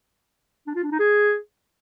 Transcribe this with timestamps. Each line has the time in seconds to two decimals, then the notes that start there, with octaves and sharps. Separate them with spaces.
0.67 D4
0.75 F4
0.83 D4
0.91 D#4
0.99 G#4